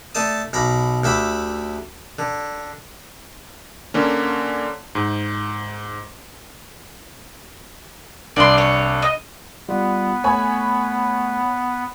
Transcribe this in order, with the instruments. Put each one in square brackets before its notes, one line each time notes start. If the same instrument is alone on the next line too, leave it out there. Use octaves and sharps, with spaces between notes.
[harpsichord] A3 D5 A5 D#6
B1 A#5 B5 D6
D2 G4 E5 B5 D6
D3
[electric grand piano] D3 A#3 C#4
G#2
[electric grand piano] C2 D4 [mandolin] D5 C6
[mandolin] C#5
D#5
[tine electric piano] G3 F4 [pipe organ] B3
[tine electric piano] A3 [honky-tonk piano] C#5 G#5 B5